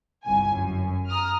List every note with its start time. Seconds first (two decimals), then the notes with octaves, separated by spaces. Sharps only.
0.24 G1 C2 G#5
0.52 F#2
1.08 A#5 D#6 F6